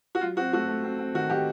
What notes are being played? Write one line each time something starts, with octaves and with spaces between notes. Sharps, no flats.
F#4
F#3 F4
C4 F#4
A3 F#4
A3
C4
C4
D#3 F#4
D#3 G4